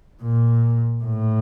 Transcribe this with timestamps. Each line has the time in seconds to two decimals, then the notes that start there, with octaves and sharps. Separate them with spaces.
0.23 A#2
1.04 A2